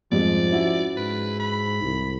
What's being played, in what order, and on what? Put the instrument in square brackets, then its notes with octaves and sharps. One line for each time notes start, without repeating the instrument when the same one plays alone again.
[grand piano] F2 G#2 G3 [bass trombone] F3 [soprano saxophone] D5
[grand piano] C#4 E4 F#4
[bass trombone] G#2 [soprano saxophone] B4
[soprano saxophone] B5
[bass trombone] C2